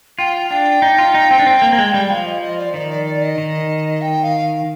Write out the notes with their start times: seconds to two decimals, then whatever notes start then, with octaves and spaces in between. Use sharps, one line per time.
0.18 F4 G5
0.50 D4 G5
0.82 D#4
0.98 F4
1.14 D#4
1.31 C4
1.39 D4
1.47 C4
1.62 A#3
1.72 A#3
1.78 G#3
1.94 G3
2.10 F3 F5
2.27 D#5
2.42 D#5
2.58 D5
2.74 D#3 D5
2.90 D5
3.06 D5
3.22 D#5
3.38 D#3
4.02 G5
4.23 F5